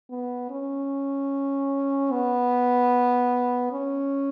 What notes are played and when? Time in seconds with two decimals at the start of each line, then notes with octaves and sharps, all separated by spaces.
0.11 B3
0.50 C#4
2.12 B3
3.72 C#4